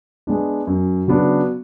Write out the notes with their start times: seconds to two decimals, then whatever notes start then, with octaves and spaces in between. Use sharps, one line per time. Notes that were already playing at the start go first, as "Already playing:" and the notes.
0.27 G#3 B3 D4
0.67 F#2
1.08 C#3 F#3 B3 D4